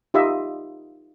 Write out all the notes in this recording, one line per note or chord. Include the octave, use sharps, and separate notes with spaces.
D#4 F4 G4 D#5 E5